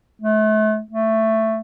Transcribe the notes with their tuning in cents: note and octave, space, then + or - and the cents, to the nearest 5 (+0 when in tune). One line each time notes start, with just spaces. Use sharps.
A3 -35
A3 +10